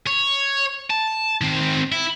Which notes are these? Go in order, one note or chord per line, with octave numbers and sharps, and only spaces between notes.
C#5
A5
D#3 C4
E4